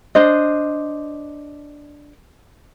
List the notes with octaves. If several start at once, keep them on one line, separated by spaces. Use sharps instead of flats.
D4 C5 D#5